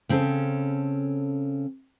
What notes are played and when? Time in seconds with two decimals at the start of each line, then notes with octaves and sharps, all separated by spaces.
0.09 C#3 C4 C#4 A4